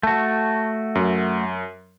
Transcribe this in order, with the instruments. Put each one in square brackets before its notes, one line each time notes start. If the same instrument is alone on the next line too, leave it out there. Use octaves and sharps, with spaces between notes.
[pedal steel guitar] A3 F#4 [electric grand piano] A5
[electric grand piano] F#2